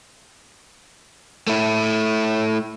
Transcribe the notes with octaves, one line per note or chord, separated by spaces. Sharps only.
A3 E4